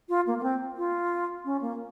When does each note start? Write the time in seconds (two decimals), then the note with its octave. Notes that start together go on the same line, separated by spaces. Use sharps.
0.09 F4
0.27 A#3
0.38 A#3
0.43 C4
0.77 F4
1.45 C#4
1.61 A#3